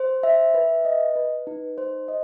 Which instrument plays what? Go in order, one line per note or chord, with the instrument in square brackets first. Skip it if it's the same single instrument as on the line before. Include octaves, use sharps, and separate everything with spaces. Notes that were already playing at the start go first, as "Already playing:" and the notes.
Already playing: [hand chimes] C5
E5
B4
D#5
B4
D#4
C5
D#5